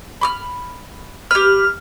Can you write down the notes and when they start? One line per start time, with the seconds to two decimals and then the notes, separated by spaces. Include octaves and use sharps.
0.21 B5 D6 F6
1.31 G4 B4 F6